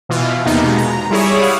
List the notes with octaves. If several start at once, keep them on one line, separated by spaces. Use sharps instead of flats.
B2 E3 F4
E2 C3 A#3 B3 D#4
B2 G#3
A#5
G3 E4 G#4 C#5
F5 F#5 D#6